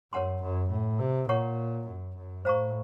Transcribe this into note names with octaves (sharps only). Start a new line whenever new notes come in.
F#2 A#4 C#5 F#5 A5 C6
F#2
A2
C3
A#2 A#4 C#5 F#5 A#5 C#6
F#2
F#2
A2 C5 F5 A#5 C#6